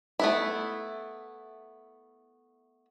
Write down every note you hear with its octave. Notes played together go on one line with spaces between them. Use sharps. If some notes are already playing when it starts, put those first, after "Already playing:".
A3 B3 E4